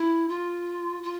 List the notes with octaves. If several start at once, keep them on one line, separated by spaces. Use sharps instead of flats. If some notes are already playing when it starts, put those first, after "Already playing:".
Already playing: E4
F4
F4